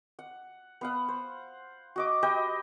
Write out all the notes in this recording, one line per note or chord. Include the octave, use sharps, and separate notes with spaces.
F#5
B3 F5 F#5
C5
F#4 D#5 D6
G4 B4 D#5 G5